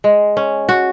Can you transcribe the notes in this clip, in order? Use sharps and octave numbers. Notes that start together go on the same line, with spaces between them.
G#3
C#4
F#4